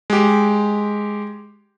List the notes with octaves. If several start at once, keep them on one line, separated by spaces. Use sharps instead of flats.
G#3 G4